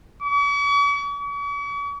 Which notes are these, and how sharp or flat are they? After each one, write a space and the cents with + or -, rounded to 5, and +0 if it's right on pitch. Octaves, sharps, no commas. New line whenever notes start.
C#6 +45
C#6 +45